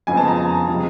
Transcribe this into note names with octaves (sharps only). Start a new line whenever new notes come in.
F2 C#3 F3 G#3 B3 G#5
A5
A#5
C3 F3 G#3